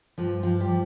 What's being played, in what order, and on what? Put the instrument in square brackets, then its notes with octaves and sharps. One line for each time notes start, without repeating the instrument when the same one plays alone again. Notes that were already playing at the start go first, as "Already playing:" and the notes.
[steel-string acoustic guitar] G2 F3 F4
G2 F3 F4
G3 G4
F3